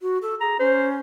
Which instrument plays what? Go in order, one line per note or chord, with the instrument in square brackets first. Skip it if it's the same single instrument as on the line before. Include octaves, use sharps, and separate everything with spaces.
[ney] F#4
A4
[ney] G#4 [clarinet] A#5
[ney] C#4 [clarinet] C5